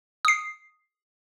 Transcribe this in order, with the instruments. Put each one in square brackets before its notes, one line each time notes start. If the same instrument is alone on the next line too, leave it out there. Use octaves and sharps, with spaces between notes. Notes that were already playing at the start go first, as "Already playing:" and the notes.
[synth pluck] D#6 C7